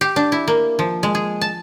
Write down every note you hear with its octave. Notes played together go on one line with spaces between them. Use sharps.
G4
D4
E4
A#3
F3
G#3
G#4
A5